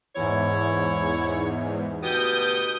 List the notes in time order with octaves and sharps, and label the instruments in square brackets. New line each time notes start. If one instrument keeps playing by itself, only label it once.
[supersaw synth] E2 G#2 [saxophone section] E4 C#5
[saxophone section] D2 B2 G4 [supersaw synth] D#6 G6